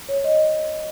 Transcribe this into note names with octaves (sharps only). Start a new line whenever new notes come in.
C#5
D#5